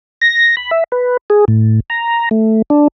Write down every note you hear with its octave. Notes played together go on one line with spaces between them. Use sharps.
A#6
B5
E5
B4
G#4
A2
A#5
A3
D4